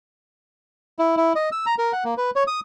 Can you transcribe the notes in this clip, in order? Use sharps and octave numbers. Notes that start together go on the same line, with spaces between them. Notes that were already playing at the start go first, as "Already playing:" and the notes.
E4
E4
D#5
E6
A#5
A#4
F#5
A#3
B4
C#5
D#6